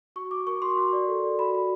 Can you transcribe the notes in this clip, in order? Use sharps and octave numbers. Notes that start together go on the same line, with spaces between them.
F#4 C#6
F#4 D6
A#4 C#6
F#4 C6
F#4
D5
A4
D5
F#4 B5
F#4